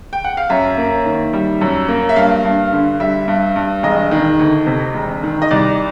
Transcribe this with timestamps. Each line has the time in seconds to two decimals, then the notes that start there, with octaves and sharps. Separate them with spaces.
0.13 G5
0.24 F#5
0.37 F5
0.50 F#2 E5
0.78 A#3
1.05 D#3
1.33 G3
1.61 F#2
1.88 A#3
2.09 E5
2.16 G2 F5
2.45 G2
2.72 D3
3.00 G3 E5
3.28 G2
3.56 G2
3.83 E1 D#5
4.11 D#3
4.39 D2
4.67 C3
4.94 E1
5.23 D#3
5.42 D#5
5.51 C2 D5